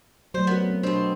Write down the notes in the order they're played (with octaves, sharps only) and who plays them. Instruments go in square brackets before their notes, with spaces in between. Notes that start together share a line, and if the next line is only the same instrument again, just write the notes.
[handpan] F#3 A3 [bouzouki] C5
[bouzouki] B3 [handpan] F#4 A#4 C5
[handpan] C4
[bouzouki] B2 C4 [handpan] D4 F#4